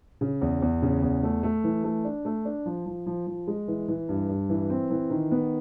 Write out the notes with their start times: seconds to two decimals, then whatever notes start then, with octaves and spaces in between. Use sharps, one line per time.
0.21 C#3
0.41 E2
0.62 E2
0.82 C#3
1.03 E2
1.23 A3
1.43 A3
1.64 E3
1.84 A3
2.05 D4
2.25 A3
2.45 D4
2.66 F3
2.86 F3
3.06 F3
3.27 F3
3.47 G#3
3.68 E3
3.88 E3
4.09 G2
4.29 G2
4.49 E3
4.70 C4
4.90 E3
5.10 D#3
5.32 B3